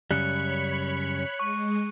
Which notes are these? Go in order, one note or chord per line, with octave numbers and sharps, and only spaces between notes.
F#2 C#3 G3 C#5 B5 C#6 F#6 C#7
G#3 C#6